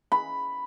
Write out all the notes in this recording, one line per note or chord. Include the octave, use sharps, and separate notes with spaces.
B5